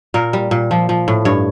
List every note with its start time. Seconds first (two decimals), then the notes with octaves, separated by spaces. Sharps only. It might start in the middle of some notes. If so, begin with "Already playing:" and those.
0.14 A#2 A#4
0.33 G3
0.51 A#2
0.71 F3
0.89 F3
1.08 A2
1.25 G2 C#5